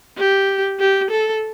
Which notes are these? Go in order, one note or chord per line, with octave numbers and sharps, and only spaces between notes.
G4
G4
A4